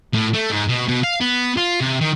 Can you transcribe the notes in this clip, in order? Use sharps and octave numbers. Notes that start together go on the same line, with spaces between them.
A2
A3
G#2
B2
B2
F5
B3
F4
C3
D#3